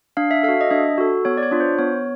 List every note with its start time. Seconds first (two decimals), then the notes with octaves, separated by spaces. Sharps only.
0.17 D4 F5
0.31 E5
0.43 A4 F5
0.49 F#4
0.61 D#5
0.71 D4 E5
0.98 F#4 A4
1.25 B3 C#5
1.37 D5
1.43 C#5
1.51 D4 F4
1.60 C5
1.79 B3 C#5